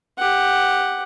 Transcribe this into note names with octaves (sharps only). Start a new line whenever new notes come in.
G4 F#5